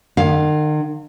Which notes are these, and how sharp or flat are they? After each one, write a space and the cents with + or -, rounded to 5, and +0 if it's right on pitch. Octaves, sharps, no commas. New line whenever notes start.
D#3 -40 F5 +10